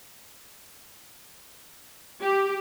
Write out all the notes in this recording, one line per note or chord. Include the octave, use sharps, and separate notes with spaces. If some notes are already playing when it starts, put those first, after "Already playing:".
G4